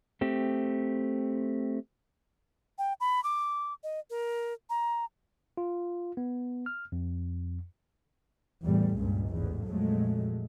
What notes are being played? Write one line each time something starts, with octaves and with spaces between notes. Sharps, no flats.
A3 C4 G4
G5
B5
D6
D#5
A#4
A#5
F4
B3
F6
F2
E2 A2 G3
C#2 G2 A#2
A1 E2 G#2
F2 A#2 F#3 G#3 A3